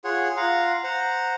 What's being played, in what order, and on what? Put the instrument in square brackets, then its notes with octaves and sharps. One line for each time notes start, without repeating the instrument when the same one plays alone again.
[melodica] F4 G#4 C#5 F#5
F4 F5 F#5 A#5
C5 F#5 A#5